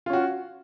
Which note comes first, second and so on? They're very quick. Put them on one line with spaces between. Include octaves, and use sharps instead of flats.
F4 C#4 F#4